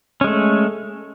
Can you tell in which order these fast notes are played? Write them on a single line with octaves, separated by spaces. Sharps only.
C#4 G#3 A3